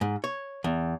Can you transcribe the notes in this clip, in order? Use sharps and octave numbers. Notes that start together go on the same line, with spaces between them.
G#2
C#5
E2